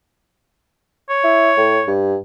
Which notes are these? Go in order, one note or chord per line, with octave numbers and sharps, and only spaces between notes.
C#5
E4
A2
G2